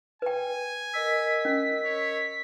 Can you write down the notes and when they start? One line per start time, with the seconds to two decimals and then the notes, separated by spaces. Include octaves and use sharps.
0.22 B4 G5 G#5
0.93 A#4 D#5 E6 B6
1.45 C#4
1.85 C#5